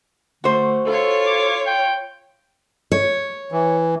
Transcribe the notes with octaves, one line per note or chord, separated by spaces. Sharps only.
D3 A3 F#4 C5
F4 A4 C#5
D6
G5
C#5
E3